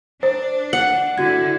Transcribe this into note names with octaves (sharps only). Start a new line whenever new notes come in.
D4 C5
F#5
D3 E4 F#4 G#6